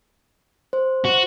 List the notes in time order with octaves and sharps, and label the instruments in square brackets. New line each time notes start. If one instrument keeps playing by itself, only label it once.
[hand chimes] C5
[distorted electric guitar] F#4